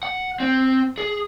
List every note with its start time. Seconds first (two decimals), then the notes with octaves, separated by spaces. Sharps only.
0.03 F#5
0.40 C4
0.98 G#4